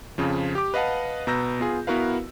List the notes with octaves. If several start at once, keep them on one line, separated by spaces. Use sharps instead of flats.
F2 C#3 F3
G4 D6
B4 D#5 F5 F#5 A5
B2 B4 A#5 E6 G6 A#6
B3 F4 G#4
B3 E4 F#4 A#4 B4 F5